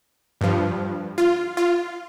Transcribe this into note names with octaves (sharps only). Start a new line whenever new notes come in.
G2 F3
F4
F4